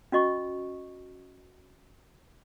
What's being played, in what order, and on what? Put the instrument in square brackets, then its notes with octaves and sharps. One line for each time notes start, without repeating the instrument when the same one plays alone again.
[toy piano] C#4 F#4 D#5 C#6